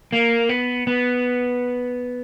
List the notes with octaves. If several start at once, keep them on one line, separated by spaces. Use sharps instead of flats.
A#3
B3
B3